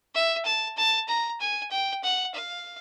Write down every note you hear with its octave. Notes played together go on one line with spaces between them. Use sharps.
E5
A5
A5
A#5
G#5
G5
F#5
F5